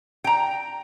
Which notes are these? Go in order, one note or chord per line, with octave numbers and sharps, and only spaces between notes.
G5 A#5